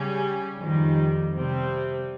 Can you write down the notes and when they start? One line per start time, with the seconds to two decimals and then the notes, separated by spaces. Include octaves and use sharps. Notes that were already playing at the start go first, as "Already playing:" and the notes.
Already playing: C#3 G3 C#4
0.58 F2 D#3 G3
1.34 C3 G3 C4